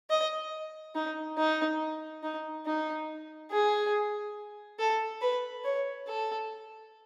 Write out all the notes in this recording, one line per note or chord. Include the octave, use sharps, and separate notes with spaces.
D#5
D#4
D#4
D#4
D#4
G#4
A4
B4
C#5
A4